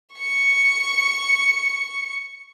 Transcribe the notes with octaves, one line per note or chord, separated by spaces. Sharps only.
C#6 C#7